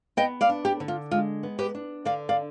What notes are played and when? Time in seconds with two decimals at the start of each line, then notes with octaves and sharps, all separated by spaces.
0.17 B3 D#5 G5
0.41 D5 F5
0.49 D4
0.65 G4
0.80 D3
0.88 F4
1.11 G#3 F4
1.43 B3
1.59 G4 B4
1.75 D4
2.05 D3 D5 F5
2.29 D5 F5